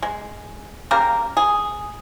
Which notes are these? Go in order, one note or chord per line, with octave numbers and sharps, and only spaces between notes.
G#3
C#3 G3 A#3 A#4
G#4